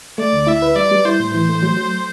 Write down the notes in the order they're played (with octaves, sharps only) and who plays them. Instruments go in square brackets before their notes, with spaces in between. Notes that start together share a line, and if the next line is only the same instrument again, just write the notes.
[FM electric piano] A3 [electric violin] D5
[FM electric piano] D2
[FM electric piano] E4 [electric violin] E5
[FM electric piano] B4
[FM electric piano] G3 [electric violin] D5
[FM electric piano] G3
[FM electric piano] E4 [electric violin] C5
[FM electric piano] A2
[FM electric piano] E3 [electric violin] C5
[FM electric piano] A3
F#3
F#3